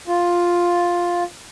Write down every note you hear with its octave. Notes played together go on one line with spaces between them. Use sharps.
F4